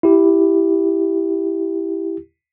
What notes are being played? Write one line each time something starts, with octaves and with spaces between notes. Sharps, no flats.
E4 G4